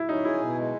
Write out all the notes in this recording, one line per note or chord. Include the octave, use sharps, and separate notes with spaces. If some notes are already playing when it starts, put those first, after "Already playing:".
Already playing: E4
C#4 D#4
E4 G#4
B2
G#3